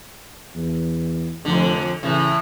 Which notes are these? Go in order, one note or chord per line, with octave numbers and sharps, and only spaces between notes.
E2
F1 F2 D3
A2 C#3 E3